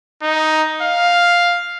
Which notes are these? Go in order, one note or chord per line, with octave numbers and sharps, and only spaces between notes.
D#4
F5